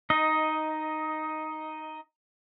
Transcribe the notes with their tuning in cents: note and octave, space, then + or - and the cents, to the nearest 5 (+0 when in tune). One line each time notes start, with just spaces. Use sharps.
D#4 +0 D#5 +10